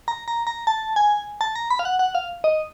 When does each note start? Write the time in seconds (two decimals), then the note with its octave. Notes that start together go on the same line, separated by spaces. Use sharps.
0.08 A#5
0.28 A#5
0.47 A#5
0.67 A5
0.96 G#5
1.41 A5
1.55 A#5
1.70 B5
1.79 F5
1.85 F#5
1.99 F#5
2.15 F5
2.44 D#5